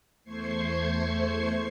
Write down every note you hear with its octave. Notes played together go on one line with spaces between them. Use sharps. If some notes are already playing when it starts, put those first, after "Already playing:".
E2 A3 C5 C#6 G#6 C7